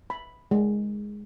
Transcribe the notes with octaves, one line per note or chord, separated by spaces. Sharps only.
B5
G#3